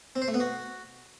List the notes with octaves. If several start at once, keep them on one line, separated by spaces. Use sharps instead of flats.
C4
C5
A3
B3
F#4